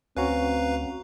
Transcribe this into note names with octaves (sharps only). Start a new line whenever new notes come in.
D2 C4 C#4 F#4 B4 F5 A#5